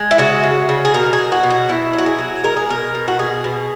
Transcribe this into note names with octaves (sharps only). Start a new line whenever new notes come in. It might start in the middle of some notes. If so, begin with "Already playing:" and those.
Already playing: G#3
E4
C#3 F#4
C#3
C#3
G#4
B2 A#4
G#4
F#3
F#4
B2
F#4
B2 E4
F#3
F#4
G#4
F#3
G#3 A#4
G#4
B2 A#4
B2
F#4
B2 G#4
B2